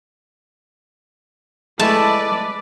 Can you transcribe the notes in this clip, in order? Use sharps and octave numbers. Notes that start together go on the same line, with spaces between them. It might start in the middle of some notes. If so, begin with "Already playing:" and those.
G#3 A3 E4 B4 D5 A5